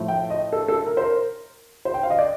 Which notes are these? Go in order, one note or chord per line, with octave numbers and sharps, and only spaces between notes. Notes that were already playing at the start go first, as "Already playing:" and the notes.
Already playing: A2 F3 A3
G5
D#5
A4
A4
A#4
C5
A#4
C5
G5
F5
D#5
D5